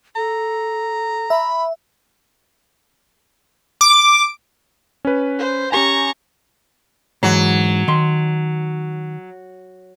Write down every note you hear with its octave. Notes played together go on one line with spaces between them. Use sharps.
A4 A#5
E5 B5
D6
C#4 B4
C5
C#4 G4 G#5 A#5 C#6
G#2 E3 F#3
D#3 C6